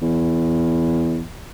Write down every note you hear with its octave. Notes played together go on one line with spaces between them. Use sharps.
E2